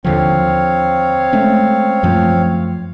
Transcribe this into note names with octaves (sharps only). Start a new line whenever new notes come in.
D#2 D3 F3 C4 C#5 F5
G#3 A3 C#4
F#2 F3 A3